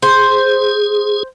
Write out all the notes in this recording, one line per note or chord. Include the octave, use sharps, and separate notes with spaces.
G#4 C5